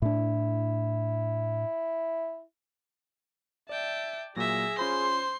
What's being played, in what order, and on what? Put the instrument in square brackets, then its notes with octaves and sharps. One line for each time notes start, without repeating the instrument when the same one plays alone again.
[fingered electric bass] A2 D4 [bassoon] E4
[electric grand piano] D5 [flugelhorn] E5 [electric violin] G5 A5
[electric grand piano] A#2 F#3 [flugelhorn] G#4 [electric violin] E5 A#6
[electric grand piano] C#4 F4 B5 [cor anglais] C5 [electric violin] C6